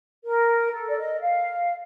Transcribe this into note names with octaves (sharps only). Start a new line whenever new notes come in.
A#4
A4
D5
D#5
F5